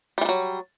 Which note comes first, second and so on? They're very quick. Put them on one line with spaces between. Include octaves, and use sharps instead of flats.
G3 E3 D#3 F#3